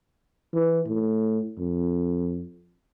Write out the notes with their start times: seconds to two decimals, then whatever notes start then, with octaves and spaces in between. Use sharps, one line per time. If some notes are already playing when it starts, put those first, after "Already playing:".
0.53 E3
0.87 A2
1.58 F2